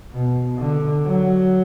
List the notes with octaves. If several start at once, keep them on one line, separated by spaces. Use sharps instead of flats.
B2
D3
F#3